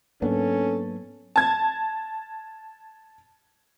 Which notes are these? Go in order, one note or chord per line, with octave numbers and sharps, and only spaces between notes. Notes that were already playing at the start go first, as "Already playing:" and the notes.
G#2 F#3 A#3 B3 C#4 D4 A4
A5 G#6